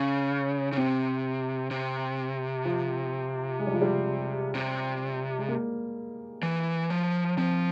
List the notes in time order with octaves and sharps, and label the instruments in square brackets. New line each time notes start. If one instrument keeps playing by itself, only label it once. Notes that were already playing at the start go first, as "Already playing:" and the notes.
Already playing: [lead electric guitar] C#3
C#3
[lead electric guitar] C3 [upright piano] C4
[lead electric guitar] C3
[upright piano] F3
G#3
G3
F3
G3
[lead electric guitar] C3
[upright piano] G#3
A#3
[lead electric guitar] E3
F3
[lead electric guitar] F3 [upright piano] C4